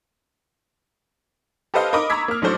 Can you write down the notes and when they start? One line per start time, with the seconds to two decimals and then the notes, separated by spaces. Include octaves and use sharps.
1.74 G4 A4 B4 C5 D#5 F5
1.93 A#4 D#5 B5 D6 D#6
2.10 A#5 B5 C#6 E6 G#6 B6
2.28 A#3 F6
2.42 A1 F#3 A3 D4 C5 C#6